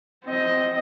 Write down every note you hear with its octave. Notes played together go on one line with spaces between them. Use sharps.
C4 D#5